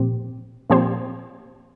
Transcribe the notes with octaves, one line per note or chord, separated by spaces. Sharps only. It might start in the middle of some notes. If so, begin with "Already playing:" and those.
Already playing: A#2 F3 C4 G4
A#2 F3 C4 G4 C5